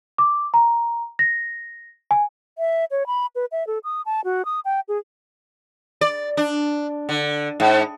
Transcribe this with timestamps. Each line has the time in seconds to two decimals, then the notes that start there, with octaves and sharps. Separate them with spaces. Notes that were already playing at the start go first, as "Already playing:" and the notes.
0.18 D6
0.54 A#5
1.19 A#6
2.11 G#5
2.58 E5
2.91 C#5
3.07 B5
3.35 B4
3.52 E5
3.67 A4
3.84 D#6
4.06 A5
4.24 F#4
4.45 D#6
4.65 G5
4.88 G#4
6.01 D5
6.37 D4
7.09 D3
7.60 G#2